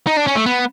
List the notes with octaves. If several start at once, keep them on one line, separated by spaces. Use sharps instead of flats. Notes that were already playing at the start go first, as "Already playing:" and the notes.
D#4
D4
C#4
A3
B3